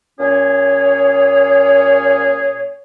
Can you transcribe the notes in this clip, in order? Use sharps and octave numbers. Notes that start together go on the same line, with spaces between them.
A#2 C#4 G#4 C#5